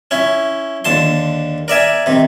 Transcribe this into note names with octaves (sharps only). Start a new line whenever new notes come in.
C#4 E4
D#2 D3 A5 C6
A#4 D5 E5 G#5
C3 D#3